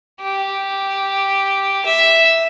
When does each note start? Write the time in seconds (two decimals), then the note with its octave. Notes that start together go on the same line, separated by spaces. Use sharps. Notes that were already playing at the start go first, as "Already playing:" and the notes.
0.22 G4
1.85 E5